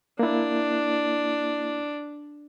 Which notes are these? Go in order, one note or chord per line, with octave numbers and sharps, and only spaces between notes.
A#3 D4 E4